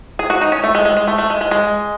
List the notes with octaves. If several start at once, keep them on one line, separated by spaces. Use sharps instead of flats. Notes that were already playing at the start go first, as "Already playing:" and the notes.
G#4
F#4
D#4
C#4
A3
G#3
G#3
G#3
A3
A3
G#3
G#3
G#3